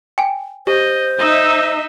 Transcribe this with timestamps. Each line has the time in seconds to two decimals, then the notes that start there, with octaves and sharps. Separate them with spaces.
0.18 G5 G#5
0.67 G4 C5 D#5
1.19 D#4 D#5 E5 E6